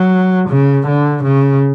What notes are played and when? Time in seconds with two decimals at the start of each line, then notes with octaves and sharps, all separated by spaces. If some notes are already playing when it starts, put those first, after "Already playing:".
Already playing: F#3
0.49 C#3
0.87 D3
1.23 C#3